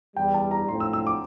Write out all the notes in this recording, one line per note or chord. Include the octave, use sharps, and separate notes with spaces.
E2 E3 G3 G5
A5
A#5
A2 F3 C4 C6
E6
E6
D6